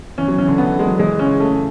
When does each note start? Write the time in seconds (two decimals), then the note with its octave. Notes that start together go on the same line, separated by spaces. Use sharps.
0.18 E3 C#4
0.28 F#3
0.38 E3 C#4
0.48 D3
0.58 B3
0.79 G#3
0.87 F#3
0.99 E3 G#3
1.19 C#3 C#4
1.40 A3